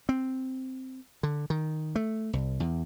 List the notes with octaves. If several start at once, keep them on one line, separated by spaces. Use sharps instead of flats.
C4
D3
D#3
A3
C2
E2